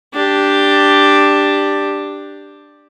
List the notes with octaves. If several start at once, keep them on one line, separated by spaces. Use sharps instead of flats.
D4 G4